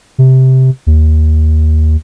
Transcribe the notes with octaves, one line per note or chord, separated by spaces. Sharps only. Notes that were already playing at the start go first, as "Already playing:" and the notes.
C3
D#2